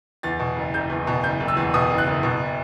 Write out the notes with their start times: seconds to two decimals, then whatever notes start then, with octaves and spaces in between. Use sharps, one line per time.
0.23 E2 A6
0.40 B2
0.56 F#1
0.74 F#1 G6
0.90 E2
1.07 B2
1.23 F#1 G6
1.40 F#1
1.48 E6
1.57 E2
1.74 B2 D#6
1.90 F#1
1.98 F#6
2.07 F#1
2.23 B2